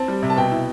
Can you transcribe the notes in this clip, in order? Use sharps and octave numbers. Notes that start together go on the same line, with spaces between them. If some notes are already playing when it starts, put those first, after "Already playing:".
Already playing: C4 A5
G3
C3
A5
B2 G5
E4